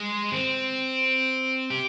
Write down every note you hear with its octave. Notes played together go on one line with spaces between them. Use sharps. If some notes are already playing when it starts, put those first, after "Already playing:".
Already playing: G#3
C4
G4